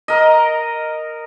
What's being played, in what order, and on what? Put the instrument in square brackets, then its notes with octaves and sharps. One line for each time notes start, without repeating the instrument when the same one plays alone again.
[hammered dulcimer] A#4 D#5